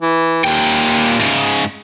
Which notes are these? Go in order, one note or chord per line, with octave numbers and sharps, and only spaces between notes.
E3
D#2 A#2 G5
G#2 C#3